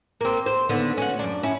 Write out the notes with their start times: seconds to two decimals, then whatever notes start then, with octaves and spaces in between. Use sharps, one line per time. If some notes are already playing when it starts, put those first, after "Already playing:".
0.21 A#3 C4
0.46 C5
0.69 D#2 D3 B3
0.98 C#4 F#4
1.19 F#2 D4
1.43 C#4 E4